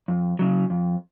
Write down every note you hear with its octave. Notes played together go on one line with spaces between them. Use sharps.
F2
C#3 F#3
F2